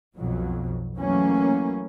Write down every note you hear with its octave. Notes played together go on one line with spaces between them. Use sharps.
B1 F2 B2 F#3
E3 F#3 A3 A#3 C#4